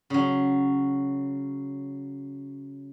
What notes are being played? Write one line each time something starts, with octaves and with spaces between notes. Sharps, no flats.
C#3 F#3